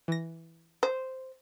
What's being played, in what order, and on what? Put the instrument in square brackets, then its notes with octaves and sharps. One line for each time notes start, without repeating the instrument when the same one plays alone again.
[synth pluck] E3 A#6
[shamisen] C5